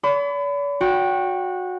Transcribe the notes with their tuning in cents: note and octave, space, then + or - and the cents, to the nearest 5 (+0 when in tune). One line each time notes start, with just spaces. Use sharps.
D5 -45 B5 +30
F#4 -20 G5 +0